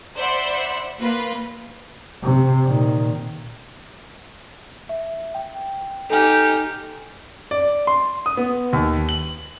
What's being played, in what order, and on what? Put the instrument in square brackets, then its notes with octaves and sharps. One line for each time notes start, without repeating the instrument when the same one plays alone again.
[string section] C5 D5 E5 F#5 B5
A#3 F4 B4
[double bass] C3
A#2 D#3
[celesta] E5
G5
[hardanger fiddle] D#4 G4 [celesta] A4 G#5 F6
[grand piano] D5
C6
D#6
B3
D#2
F#7